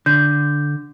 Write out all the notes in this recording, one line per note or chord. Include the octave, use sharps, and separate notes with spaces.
D3 G6